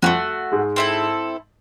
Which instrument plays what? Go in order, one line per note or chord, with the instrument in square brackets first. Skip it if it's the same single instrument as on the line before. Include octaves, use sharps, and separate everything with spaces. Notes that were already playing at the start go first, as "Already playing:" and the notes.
[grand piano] F2 F3 [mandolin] A3 C#4 F#4
[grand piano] G#2 G#3
[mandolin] C4 E4 A4